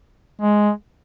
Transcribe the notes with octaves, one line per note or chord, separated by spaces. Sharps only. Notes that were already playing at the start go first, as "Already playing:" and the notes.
G#3